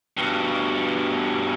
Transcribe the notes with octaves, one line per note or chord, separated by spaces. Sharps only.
G2 B2